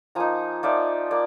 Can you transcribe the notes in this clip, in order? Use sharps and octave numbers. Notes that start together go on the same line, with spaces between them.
F3 A#3 D#4 G#5 A#5
F3 A#3 D#4 D5 E5
A#3 D5